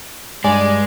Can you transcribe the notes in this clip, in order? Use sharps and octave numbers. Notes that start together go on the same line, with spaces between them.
G2 G#3 D5 G#5